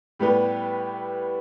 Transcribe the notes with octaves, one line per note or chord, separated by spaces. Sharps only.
A2 G3 B3 G4 B4